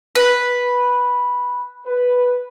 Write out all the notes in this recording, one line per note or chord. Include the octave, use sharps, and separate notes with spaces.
B4
B4